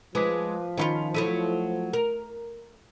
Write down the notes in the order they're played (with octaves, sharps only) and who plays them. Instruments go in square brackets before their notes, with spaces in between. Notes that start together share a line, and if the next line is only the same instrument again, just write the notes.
[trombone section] F3 [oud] G#3 [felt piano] B4 D6 B6
[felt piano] D#3 B5 C#7 [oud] C#4 E4 F4
[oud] F#3 A3 E4 [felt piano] D#7
[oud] A#4